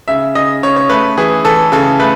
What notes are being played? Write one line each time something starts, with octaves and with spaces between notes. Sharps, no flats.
C#3 E5
C#3 D#5
C#3 C#5
C#5
A3 B4
E3 G#4
E3 A4
C#3 A4
A3 B4